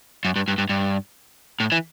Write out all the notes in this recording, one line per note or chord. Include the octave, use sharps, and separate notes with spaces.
F#2
G2
G2
G2
G2
A2
E3